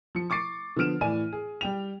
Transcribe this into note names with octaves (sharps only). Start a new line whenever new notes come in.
F3 C#7
C#6 D6 A6 C7 D7
D3 F3 B3 F6 D7 E7
A2 E3 D5 G#5 D#7
G#4
G3 G5 F7